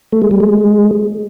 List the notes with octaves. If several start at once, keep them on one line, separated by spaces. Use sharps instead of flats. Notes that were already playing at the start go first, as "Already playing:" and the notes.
A3
G#3
G3
G#3